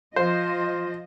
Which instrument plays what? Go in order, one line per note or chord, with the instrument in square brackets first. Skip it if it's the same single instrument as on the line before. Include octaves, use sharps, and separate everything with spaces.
[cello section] F3 D#5 [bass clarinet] F4 [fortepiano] C5